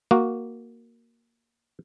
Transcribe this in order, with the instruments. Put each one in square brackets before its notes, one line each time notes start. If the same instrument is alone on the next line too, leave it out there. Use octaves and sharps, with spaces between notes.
[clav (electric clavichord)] A#3 F#4